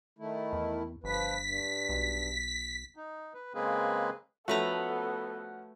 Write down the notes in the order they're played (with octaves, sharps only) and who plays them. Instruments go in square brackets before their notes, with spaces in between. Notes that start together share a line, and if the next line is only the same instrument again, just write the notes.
[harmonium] D#3 A3 E4
[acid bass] E2
[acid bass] G1 [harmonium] F3 B4 [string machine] B6
[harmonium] G2
[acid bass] B1
[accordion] D#4
B4
C#3 G#3 A#3 C4 G#4 B4
[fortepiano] F3 C#4 F#4 [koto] A3 B4 A#5 [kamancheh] B3 A4